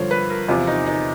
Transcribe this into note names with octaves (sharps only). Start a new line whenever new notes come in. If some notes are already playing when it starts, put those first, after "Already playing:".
Already playing: G2 D3 F3 C5 C#5
B4
A#4
E2 C3 F3 F4
D#4
D#4